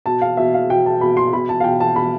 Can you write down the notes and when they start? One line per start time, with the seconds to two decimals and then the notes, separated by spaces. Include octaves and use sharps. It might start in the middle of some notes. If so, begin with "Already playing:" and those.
0.06 B2 A5
0.21 F5
0.37 B2 E5
0.54 F5
0.70 B2 G5
0.86 A5
1.01 B2 B5
1.17 C6
1.33 B2 B5
1.49 A5
1.60 F5
1.64 B2 G5
1.80 A5
1.96 B2 B5